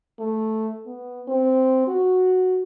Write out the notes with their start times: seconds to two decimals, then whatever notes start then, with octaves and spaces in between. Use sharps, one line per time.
0.19 A3
0.86 B3
1.28 C4
1.87 F#4